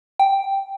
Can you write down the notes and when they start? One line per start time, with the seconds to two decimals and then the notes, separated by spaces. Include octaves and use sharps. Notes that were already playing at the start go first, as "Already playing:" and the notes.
0.19 G5